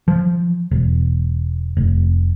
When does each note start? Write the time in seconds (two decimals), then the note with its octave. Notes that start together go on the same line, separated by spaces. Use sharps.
0.08 F3
0.71 E1
1.77 F1